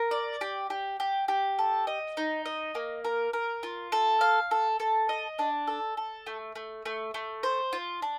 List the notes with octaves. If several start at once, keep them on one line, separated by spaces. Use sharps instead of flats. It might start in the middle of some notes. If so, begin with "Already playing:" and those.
Already playing: A#4
D5
G4
G4
G4
G4
A4
D#5
D#4
D#5
A#3
A#4
A#4
F4
A4
F5
A4
A4
D#5
D4
A4
A4
A3
A3
A3
A3
C5
F4
D4